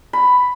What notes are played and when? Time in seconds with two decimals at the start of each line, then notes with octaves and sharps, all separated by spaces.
0.13 B5